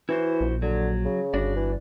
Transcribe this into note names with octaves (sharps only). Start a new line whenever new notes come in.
E3 E4 F#4 C5
A#1
D3 F#3
C#3
G1 D4 F#4 D5
E3